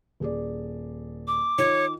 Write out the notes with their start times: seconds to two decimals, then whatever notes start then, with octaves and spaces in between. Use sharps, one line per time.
0.20 D#1 G#4 D5
1.27 D6
1.58 D#3 F4 C#5